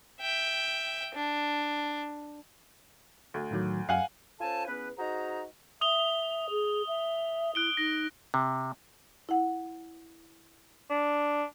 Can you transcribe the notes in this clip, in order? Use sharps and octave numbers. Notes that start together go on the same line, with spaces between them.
E5 G5
D4
D2
A2 D#3 F#3
F#2 F5 F#5 G#5
C#4 F4 A4 C5 G#5 A5
E2 B3 C#4 B4
D#4 F#4 G#4 C5 A#5
E5 D#6 F7 G7
G#4
E5
E4 F#6 D7 G7
D#4 A#6
C3
E4 F#5
D4